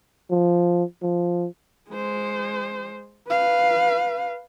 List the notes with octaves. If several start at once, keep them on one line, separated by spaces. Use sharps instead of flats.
F3
F3
G#3 C5
B4 F5